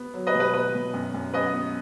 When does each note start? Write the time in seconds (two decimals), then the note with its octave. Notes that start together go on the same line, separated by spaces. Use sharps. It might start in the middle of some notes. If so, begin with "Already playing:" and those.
Already playing: B3
0.14 F#3
0.27 B4 D#5
0.34 B2
0.40 B4
0.54 B3 B4
0.74 B2
0.94 F#2
1.14 F#2
1.34 F#2 B4 D#5
1.54 B3